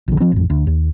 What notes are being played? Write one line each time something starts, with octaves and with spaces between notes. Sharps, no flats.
A#1 D3
F3 C4
A1 F2
D2
D#2